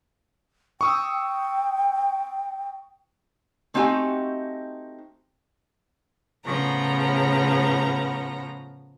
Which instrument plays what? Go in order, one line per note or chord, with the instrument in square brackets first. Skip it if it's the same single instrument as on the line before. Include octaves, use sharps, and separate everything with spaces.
[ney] G5 [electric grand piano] C#6 D#6 E6
[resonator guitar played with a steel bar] A3 C4 D#4 F#4 G4 G#5
[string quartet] A2 C#3 F3 B3 A#5